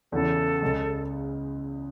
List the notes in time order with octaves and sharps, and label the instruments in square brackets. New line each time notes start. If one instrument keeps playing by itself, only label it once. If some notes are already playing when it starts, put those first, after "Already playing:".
[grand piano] E2 C#3 E3 [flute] A4
[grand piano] C#2 C#3 G#3